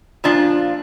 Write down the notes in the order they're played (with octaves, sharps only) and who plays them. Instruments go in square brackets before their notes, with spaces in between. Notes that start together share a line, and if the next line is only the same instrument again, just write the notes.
[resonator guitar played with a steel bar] A#2 F3 D4 F4